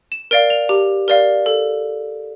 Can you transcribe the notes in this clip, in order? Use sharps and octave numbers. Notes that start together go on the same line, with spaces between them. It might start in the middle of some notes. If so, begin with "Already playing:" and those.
E7
A#4 D5 F5 D7
F7
G4
A#4 D5 F5
A4